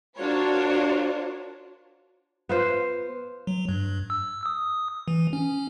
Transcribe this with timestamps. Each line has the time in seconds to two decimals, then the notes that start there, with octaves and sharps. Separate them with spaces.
0.17 D4 F4 F#4 A#4 C5 C#5
2.49 B3 F4 C5
3.47 F#3
3.69 G2
4.10 E6
4.46 D#6
5.08 E3
5.33 C#4